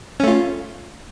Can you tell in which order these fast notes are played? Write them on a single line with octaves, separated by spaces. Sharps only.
C#4 A3 F4